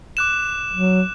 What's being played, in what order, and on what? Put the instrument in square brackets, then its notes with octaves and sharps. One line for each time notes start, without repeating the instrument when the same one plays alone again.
[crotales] D6 F#6 E7
[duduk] F#3